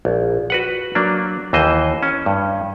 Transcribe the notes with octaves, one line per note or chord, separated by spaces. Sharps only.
A#1
F#4 B4 F#5
F#3 A#3 D4
D#2 E3 C5 D#5
C#4
G2